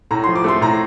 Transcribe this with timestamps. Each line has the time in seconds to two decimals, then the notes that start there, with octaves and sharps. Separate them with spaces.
0.11 A2 A#5
0.24 C6
0.27 F3
0.36 D6
0.44 A3 C6
0.61 A2 A#5